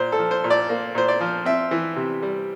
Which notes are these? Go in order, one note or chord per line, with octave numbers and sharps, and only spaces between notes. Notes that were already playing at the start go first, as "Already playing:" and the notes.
Already playing: A#2 C5
A4
F3
C5
A#2
D5
A#3
A#2 C5
D5
F3
C4 E5
E3
C3
G3